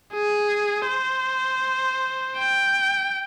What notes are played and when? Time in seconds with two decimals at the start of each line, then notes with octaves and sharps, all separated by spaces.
0.14 G#4
0.88 C5
2.37 G5